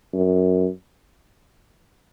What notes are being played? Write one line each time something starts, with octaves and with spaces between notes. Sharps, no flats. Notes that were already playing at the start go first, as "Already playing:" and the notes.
F#2